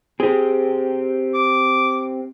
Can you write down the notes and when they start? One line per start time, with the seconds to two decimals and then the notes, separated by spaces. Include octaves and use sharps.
0.20 C4 G4 G#4
1.34 D6